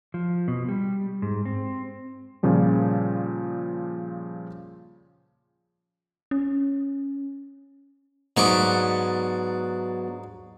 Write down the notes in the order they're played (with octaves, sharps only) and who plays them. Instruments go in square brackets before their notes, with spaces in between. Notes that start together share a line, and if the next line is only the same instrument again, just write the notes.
[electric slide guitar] F3
B2
G3
G#2
C4
[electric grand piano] A#2 C#3 F3 G3
[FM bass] C#4
[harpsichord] G#2 C#6 D6 [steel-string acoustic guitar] F#3 B3 D4